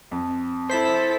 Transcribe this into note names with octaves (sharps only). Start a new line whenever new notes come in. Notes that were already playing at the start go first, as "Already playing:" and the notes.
F2
E4 A4 C5 B6